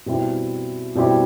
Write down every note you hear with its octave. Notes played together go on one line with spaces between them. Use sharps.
B2 G3 C4 E4 G4
B2 G3 C4 E4 G4